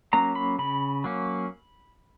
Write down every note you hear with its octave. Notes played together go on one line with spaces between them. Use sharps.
F#3 A#3 C#4 A#5
B5
C#3 B5
F#3 A#3 C#4